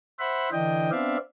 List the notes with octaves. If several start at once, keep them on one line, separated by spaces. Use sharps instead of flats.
C5 E5 F#5 B5
D3 E3 D4 D#5 G5
B3 C4 D4 D5 E5 F5